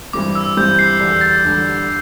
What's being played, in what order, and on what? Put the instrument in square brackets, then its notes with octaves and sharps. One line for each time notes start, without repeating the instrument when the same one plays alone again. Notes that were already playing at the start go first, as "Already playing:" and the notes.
[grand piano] G2 E3 G3 C4 [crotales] D6
[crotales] E6
[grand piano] G2 E3 G3 C4 [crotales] G6
[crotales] C7
[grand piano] E2 D3 G3 D4 [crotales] C7
[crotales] A6
[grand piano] E2 D3 G3 D4